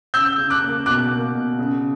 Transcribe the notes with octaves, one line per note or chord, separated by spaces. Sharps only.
C#3 E6 G6
C#3
D6 F#6
A#3
B2 D6 F#6
A#3
B2
C#3